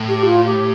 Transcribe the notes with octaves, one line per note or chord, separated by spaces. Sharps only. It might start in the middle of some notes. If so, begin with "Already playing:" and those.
Already playing: A2
G4
F4
G4